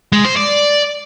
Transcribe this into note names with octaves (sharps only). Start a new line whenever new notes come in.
G#3
C5
D5